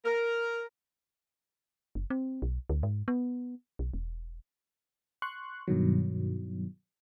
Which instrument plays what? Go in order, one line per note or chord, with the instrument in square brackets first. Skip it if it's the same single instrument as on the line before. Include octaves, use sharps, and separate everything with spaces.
[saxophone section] A#4
[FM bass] F#1
C4
B1
D2
G#2
B3
B1
E1
[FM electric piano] C6 C#6 F#6
G2 B2 D#3 F#3